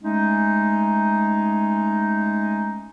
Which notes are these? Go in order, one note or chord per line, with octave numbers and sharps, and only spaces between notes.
G#3 A3 C#4 D#4